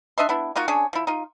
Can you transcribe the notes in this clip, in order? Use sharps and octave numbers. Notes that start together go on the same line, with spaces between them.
D4 D#5 E5 C6
B3 D4 E4
A#3 D#4 F4 F#4
C#4 D4 G#4 C#5
F3 E4
D#4 F4